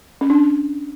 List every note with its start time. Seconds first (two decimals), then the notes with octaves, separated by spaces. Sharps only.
0.21 C#4
0.30 D4